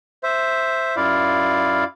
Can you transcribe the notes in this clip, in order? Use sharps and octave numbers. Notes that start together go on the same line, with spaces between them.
C5 E5
F#2 E4 F4 D5 F5